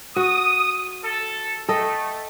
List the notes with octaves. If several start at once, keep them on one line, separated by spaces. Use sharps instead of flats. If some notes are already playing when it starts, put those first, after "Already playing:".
F#4 D#6
A4
A3 A4 D#5 G5